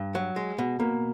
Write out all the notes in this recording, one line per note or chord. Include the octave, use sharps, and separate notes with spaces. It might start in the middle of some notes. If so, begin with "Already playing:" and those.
Already playing: G2
F#3
G#3
B2
B2 A#3